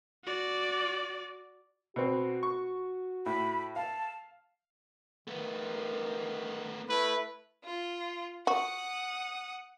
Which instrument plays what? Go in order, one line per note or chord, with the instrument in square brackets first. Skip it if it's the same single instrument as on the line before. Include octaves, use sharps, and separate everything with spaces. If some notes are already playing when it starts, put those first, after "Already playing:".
[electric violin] F#4 D5
[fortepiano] B2 C4 [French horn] F#4
[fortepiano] C#6
[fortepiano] A2 [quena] B5
[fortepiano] F5 [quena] A5
[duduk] D#3 [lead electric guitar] A3 B3
[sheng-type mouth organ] A3 E4 [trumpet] B4
[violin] F4
[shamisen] F#4 [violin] F#5 D#6